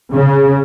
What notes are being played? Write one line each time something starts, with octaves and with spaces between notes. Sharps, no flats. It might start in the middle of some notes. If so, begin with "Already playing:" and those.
C#3